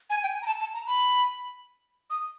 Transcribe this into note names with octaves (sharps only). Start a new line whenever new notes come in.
G#5
G5
G#5
A#5
A5
A5
A#5
B5
D#6